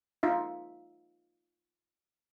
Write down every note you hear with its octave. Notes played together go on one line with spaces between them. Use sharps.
D#4 F4 E5